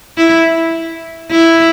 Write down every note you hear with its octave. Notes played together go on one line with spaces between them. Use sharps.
E4
E4